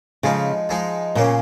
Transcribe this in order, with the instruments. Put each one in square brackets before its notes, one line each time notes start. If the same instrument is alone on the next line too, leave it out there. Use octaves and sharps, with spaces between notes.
[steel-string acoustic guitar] C#3 [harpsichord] F3 G#3 D#4
[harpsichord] F3 G#3 D#4
[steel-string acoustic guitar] A#2 [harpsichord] C#3 A#3 C#4